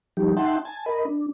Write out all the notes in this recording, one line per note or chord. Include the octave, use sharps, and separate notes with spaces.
F3 G3 D#4 G4
D#4 E5 F#5 G5 A5 C6
G#5 A5
A#4 D#5 B5
D4